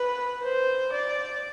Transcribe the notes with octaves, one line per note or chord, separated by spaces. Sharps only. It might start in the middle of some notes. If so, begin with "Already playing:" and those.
Already playing: B4
C5
D5